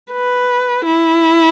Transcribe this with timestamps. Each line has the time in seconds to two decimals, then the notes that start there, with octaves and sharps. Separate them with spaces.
0.13 B4
0.86 E4